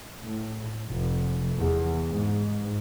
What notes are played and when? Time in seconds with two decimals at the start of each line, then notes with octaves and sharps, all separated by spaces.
0.23 A2
0.88 F1
1.56 E2
2.09 G#2